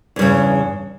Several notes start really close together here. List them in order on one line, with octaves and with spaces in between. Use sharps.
E2 G2 C#3